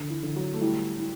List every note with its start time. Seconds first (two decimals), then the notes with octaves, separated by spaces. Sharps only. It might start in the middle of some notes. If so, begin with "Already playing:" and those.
Already playing: D3
0.10 E3
0.23 D3
0.36 F#3
0.53 A3
0.61 E3 G3 E4
1.00 E4